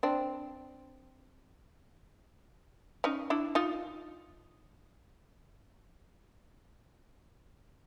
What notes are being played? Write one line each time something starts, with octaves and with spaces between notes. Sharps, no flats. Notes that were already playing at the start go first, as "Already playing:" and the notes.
C4 D4
C#4 D#4
D4 E4
D#4 F4